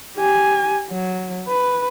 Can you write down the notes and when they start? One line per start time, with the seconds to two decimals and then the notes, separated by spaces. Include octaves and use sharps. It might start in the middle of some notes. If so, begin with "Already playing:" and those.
0.17 G4 G#5
0.90 F#3
1.48 B4